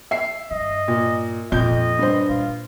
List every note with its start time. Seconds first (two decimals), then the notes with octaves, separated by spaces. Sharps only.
0.11 E5 C7
0.51 G2 D#5
0.88 A#2
1.52 F2 A#2 D3 D#5 G6
1.99 G2 C5
2.29 A#2 F4